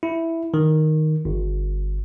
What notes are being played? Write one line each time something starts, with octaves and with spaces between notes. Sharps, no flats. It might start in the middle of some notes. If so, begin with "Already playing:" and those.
E4
D#3
G1